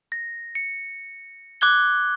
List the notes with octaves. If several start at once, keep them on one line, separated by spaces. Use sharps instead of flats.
A#6
C#7
D6 F#6 G#6 G7